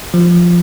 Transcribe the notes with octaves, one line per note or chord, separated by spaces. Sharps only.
F3